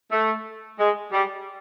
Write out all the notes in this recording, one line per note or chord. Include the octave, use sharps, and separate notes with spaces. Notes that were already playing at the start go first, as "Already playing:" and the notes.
A3
G#3
G3